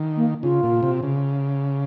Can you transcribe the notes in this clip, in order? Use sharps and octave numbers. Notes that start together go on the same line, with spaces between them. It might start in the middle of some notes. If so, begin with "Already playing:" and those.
Already playing: D#3
A#3
C#3 F4
A#2
C3
C#3